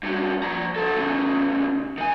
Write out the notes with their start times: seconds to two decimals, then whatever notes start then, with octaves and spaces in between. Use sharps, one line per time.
0.03 G2 F#3
0.43 F3 A#5
0.76 F#3 A4
0.96 E2 C#3
1.98 D#3 G#5